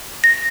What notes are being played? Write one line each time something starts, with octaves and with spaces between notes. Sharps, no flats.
A#6